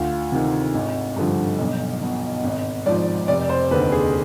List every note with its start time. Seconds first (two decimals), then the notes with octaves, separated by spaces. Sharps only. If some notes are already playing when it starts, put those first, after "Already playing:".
Already playing: D2 F4
0.32 C3 D#3
0.74 G#1
1.16 G2 D3 F3
1.59 B1
2.02 B2
2.44 G#1
2.86 G#2 F3 D5
3.28 F1 D5
3.49 C5
3.71 D#2 D3 B4
3.92 G#4